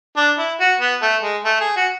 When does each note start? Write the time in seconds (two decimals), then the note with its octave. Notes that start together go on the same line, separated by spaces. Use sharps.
0.17 D4
0.38 E4
0.60 F#4
0.80 B3
1.02 A3
1.22 G#3
1.44 A3
1.60 G#4
1.76 F#4